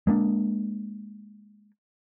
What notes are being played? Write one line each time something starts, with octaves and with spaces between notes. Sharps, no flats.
G#3 A#3 C#4 D4